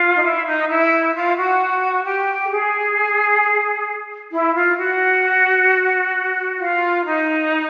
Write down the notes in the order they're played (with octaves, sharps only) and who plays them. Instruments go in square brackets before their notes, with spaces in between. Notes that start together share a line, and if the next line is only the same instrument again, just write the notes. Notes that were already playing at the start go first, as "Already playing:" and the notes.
Already playing: [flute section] F4
D#4
E4
D#4
E4
F4
F#4
G4
A4
G#4
E4
F4
F#4
F4
D#4